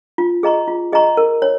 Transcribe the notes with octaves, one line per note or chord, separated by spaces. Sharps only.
F4
G#4 D#5 A#5 C#6
F4
G#4 D#5 A#5 C#6
A#4
C#5